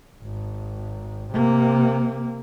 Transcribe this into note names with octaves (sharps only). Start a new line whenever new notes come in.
G#1
C3 A#3